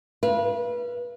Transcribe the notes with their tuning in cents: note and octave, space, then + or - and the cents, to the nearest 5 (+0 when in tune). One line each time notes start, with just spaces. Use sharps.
B4 -30 F5 -35